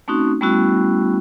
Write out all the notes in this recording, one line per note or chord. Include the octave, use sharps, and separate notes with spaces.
A3 C4 C#4 D#4 F#4
G3 A3 B3 C#4 E4 F#4